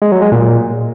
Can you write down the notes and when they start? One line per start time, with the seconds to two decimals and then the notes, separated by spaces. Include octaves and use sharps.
0.02 G#3
0.12 F#3
0.22 G#3
0.32 A#2